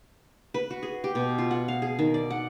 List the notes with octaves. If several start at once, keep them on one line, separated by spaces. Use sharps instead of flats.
B4
F#4
G#4
G4
B2
F4
F#5
F5
G#4
D#3
D5
F#5